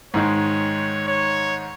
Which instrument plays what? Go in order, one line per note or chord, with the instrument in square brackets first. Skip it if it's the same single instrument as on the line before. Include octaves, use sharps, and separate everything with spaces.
[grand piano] G#2 D#3 G#3 [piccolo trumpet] C#5
[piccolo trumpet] C#5